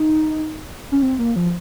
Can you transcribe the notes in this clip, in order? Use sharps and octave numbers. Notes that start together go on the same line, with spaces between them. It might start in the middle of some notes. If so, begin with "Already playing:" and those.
Already playing: D#4
C#4
C4
A#3
F3